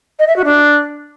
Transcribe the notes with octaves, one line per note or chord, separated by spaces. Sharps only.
D#5
E5
F#4
D4